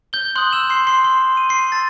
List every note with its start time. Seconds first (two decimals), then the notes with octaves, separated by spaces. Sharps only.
0.13 G6 G7
0.36 C6 D#6 F#6 G6 F#7
0.53 E6 E7
0.70 C6 C7
0.87 C6 C7
1.04 C6 C7
1.37 D#7
1.49 C6 C7
1.72 A5 E6 A6